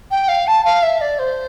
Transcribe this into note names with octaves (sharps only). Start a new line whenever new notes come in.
G5
F5
A5
F5
E5
D5
C5